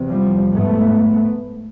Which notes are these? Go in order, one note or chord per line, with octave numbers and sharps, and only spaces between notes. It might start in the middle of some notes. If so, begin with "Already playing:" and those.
Already playing: E2 C3
F3 G3
G#2 A3 B3